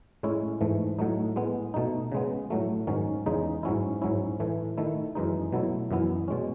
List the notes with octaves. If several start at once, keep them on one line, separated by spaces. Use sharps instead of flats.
A2 G#3 C#4 E4
G#2 E3 A3
A2 F#3 A3 D#4
A2 G#3 B3
B2 A3 D#4
C#3 G#3 B3
A2 F#3 A3
G#2 D#3 F#3 C#4
E2 C#3 G#3 D#4
G#2 F#3 C#4 E4
G#2 F#3 C#4 E4
A2 E3 A3
D#3 A3 E4
F#2 E3 G#3 D#4
B2 F#3 A3 E4
F#2 E3 B3 E4
B2 G#3 C#4